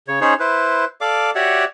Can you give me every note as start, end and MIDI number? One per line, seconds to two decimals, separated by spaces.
0.08 0.20 49
0.08 0.20 73
0.21 0.34 61
0.21 0.34 63
0.21 0.34 68
0.21 0.34 72
0.21 0.34 73
0.40 0.85 64
0.40 0.85 71
0.40 0.85 72
1.01 1.31 69
1.01 1.31 74
1.01 1.31 77
1.01 1.31 86
1.35 1.65 66
1.35 1.65 67
1.35 1.65 73
1.35 1.65 74
1.35 1.65 76
1.35 1.65 78